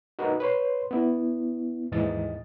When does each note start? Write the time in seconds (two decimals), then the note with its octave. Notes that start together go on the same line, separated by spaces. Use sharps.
0.19 D#4 F#4 A#4 B4 D#5
0.40 B4 C#5 C6
0.91 B3 E4
1.92 D#2 G#2 E3 D#5 A6